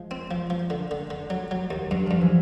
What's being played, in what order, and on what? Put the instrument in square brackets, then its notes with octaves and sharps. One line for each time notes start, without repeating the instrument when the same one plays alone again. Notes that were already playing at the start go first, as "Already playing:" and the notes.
Already playing: [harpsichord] F3 [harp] G#3
[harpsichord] C4
F3
F3
D3
D3
D3
F#3
F#3
D#2
[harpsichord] G2 [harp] F#3
[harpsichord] G2 [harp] F3
[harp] E3